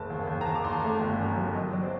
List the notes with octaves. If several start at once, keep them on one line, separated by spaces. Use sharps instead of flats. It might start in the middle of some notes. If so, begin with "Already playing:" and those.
Already playing: F#1 A5
D#2
D#2
A#5
D#2 A5
D6
D#2 C6
A#5
A3
G1
F#2
F#3
F#3 D#5
F#3 D5
C5